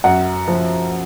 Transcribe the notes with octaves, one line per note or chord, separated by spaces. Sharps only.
F#2 F#5
F3